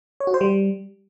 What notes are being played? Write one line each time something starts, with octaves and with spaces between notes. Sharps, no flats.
C#5
F#4
C5
G3